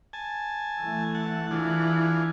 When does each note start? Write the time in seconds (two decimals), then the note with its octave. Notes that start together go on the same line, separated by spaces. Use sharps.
0.13 G#5 A5
0.81 E3 A3
1.15 F#5 A5
1.51 E3 D4 F4 G#4